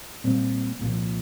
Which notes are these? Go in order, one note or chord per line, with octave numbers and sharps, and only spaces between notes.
A#2 G3 C4
C2 A#2 F3